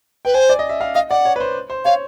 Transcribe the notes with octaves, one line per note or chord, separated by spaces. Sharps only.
B4 G5
C5 G#5
D5
D#5
E5
F5
D#5 F5
D5 F#5
C#5
B4
C5
C5
C#5 F5